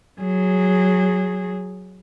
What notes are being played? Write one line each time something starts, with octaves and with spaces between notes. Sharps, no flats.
F#3 G#4